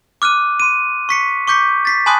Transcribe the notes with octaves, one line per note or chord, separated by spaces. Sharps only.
D6 F6 F#6 D#7
C6 D#7
C#6 B6 C#7
C#6 D6 G6 B6 C#7
A6 B6 C7
G#5 A5 B5 C6 D#6 F#6